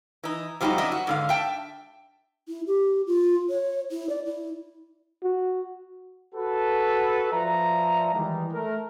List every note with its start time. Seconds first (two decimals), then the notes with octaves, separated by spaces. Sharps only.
0.23 E3 D#4
0.61 C3 F3 G3 A3 D#4 F#4
0.78 F#2 D4 D#5 E5
0.92 F#4
1.07 G#2 D3 F5
1.29 E5 G5 A5
2.48 E4
2.67 G4
3.06 F4
3.49 C#5
3.91 E4
4.09 D5
4.26 E4
5.24 F#4
6.35 F#4 A4 B4
7.33 F3 B4 D5 E5 A#5
8.14 D#3 E3 G3 G#3
8.52 A3 A#4